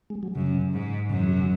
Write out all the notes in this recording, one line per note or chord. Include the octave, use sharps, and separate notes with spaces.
G#3
F#3
F#2 C#3
G#2
F#2 C#3
D#3
F#3
C#3